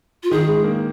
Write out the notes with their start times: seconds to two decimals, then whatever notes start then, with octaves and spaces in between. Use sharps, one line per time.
0.23 F4
0.31 D#3 G#4
0.47 G#3
0.64 A#3